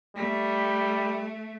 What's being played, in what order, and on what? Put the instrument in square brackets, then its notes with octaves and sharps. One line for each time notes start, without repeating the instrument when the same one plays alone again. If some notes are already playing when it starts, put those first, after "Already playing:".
[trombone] G3 [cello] A3